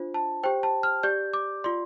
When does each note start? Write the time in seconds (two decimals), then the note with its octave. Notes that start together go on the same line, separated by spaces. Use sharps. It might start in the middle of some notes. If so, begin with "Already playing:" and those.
Already playing: D4 F4 C5
0.14 A5
0.43 G4 C5 G5
0.63 A5
0.83 F6
1.03 G4 D5 G6
1.34 D6
1.64 F4 D5 C6